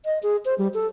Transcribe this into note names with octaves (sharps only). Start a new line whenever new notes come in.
D#5
G#4
C5
G3
A4